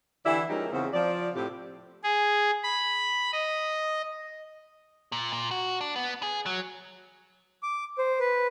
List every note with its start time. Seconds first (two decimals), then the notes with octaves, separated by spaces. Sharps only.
0.25 D3 E3 E4 G4 D5 E5
0.49 F3 G#3 C#4 D#4 G4 A#4
0.72 E2 C#3 C4
0.94 F3 D5
1.35 A2 C3 G4
2.04 G#4
2.64 B5
3.32 D#5
5.12 A#2
5.33 A#2
5.51 F#4
5.81 D4
5.96 B3
6.23 G#4
6.46 F#3
7.63 D6
7.98 C5
8.20 B4